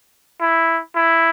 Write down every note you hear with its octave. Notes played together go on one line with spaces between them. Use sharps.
E4
E4